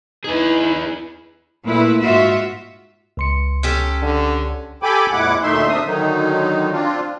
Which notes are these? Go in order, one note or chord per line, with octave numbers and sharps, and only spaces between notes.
D#4 E4 G#4 B4
A#2 A3 E4 B4
G#2 F4 F#4 E5
C#2 C6 C#7
C#4 G4 A4
D3
G4 A4 G5 G#5 B5 D6
F2 A#2 G#3 E4 F#5 D6
D2 A#2 A3 D#4 E5 C6
C4 D4 E5 D#6
D3 D#3 F#3 D#4
C4 D4 F4